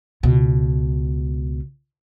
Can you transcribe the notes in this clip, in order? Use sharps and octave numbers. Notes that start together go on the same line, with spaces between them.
C#2 B2